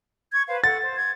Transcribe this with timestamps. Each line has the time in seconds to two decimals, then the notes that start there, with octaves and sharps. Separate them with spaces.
0.33 C#6 G#6
0.48 B4 C5 F5
0.64 A4 F#5 A6
0.80 C5
0.98 G#6